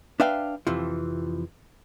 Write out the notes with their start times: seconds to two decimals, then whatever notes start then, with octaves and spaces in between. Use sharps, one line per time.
0.20 D4 B4 E5 F5 G5
0.67 F2 C3 E3 F3